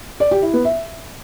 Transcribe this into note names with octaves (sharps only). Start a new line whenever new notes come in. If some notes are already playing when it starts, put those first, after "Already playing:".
D5
G4
E4
B3
E5